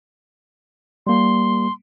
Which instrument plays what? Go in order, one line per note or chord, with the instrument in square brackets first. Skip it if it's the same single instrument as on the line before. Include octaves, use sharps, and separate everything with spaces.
[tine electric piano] G3 A#3 [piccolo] C6